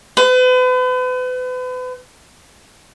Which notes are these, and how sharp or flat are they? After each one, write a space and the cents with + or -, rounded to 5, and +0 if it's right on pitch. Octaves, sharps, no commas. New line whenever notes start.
B4 +40